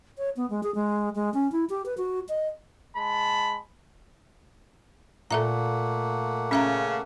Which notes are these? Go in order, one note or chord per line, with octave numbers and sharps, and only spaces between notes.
C#5
B3
G#3
G#4
G#3
G#3
C#4
E4
G4
B4
F#4
D#5
G#3 A5 B5
A#2 A3 A#3 A4 E5 F#5 A#5
C#3 C#4 E5 A#5